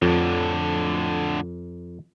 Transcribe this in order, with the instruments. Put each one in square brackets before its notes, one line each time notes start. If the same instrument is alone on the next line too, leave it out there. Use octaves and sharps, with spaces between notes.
[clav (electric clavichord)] F2 [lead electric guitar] A2 D3